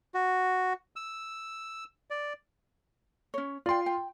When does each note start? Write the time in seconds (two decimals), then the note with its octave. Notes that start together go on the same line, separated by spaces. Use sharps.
0.14 F#4
0.96 E6
2.10 D5
3.34 C#4 C#5
3.66 F4 D5 G5 C6
3.86 G5